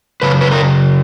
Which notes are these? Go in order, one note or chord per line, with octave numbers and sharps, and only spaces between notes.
F#2 C#3 B4
B4
A#4